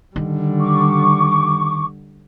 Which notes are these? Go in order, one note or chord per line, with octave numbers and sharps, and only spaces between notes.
D3 D#3 G3
C#6 D6